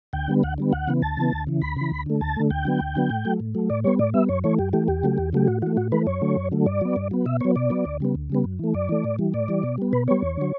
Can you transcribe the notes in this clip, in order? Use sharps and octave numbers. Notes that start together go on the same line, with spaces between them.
D2 G5
D3 G3 B3
D2 F#5
D3 G3 B3
D2 F#5
C#3 E3 B3
D2 A5
C#3 E3 B3
D2
C#3 E3
D2 B5
C#3 E3
D2
D3 A3
D2 A5
D3 A3
D2 G5
D3 F#3 B3
D2
D3 F#3 B3
A2
F#3 A3
A2
F#3 A3
A2 D5
G3 B3 C#5
A2 D5
G3 B3 E5
F#2 C#5
E3 A3 C#5
F#2 G4
E3 A3 G4
E2 G4
C#3 F#3 A3
E2
C#3 F#3 A3 G4
A2 F#4
E3 A3 F#4
A2 F#4
E3 A3 B4
F#2 C#5
D3 F#3 A3
F#2
D3 F#3 A3
G2 D5
F#3 B3
G2
F#3 B3
B2 E5
F#3 B3 C#5
B2 D5
F#3 B3
D2
C#3 G3 B3
D2
C#3 G3 B3
F#2
E3 A3
F#2 D5
E3 A3
A2
E3 G3
A2 D5
E3 G3
B2
G3 B3
B2 B4
G3 B3 C#5
E2
D3 F#3